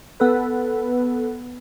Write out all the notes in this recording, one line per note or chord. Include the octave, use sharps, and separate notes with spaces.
B3 A4 B4